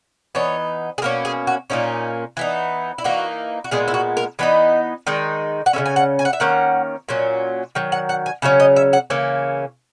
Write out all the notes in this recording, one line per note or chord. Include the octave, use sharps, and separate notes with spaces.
E3 B3 D#4 C#5
G#4
B2 A#3 C#4 A#4
G#4
F#4
A#2 A#3 C#4 D#4
E3 B3 D#4
E4
E3 A#3 D#4 F#4
F#4
A#2 G#3 B3 G#4
E4
F#4
A#4
E3 B3 D#4 D#5
D#3 G#3 D#4
F#5
C#3 G#3 C#4 E5
G#5
F#5
G#5
F#5
E5
D#3 A#3 C#4 F#5
A#2 F#3 C#4
D#3 F#3
F#5
F#5
G#5
C#3 F#3 C#4 E5
D#5
E5
F#5
C#3 E3 A#3 C#4